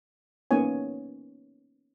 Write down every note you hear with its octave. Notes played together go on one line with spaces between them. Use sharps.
A#3 B3 C#4 D#4 C#5 G#5